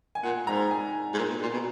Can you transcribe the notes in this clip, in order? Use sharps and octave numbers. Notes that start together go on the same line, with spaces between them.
G#5
A#2 F#5
G#2 A#5
G#5
G#2
A#2
B2
A#2
B2